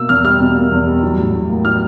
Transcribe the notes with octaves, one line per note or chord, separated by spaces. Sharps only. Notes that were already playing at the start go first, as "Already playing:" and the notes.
Already playing: B2 A#3 E6
E2 F6
G3 F6
B2
A#3
E2
G3
F#3
A2
A2
A#3
F#3 F6